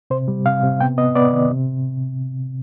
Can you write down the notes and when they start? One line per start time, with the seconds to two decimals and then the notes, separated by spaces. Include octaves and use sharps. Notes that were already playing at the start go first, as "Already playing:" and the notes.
0.10 C3 C5
0.28 G3
0.46 C3 F5
0.63 C3
0.80 B3 G5
0.98 B3 D#5
1.15 B3 D5
1.33 D#3
1.51 C3